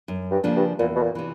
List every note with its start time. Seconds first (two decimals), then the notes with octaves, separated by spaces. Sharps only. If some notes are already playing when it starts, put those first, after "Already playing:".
0.08 F#2
0.31 G2
0.44 C#3 F3 A#3 D4
0.56 G2
0.79 E2 A#2
0.96 B2
1.03 A#2
1.15 C3 E3